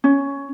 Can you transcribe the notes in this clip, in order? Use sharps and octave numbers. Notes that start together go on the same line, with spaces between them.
C#4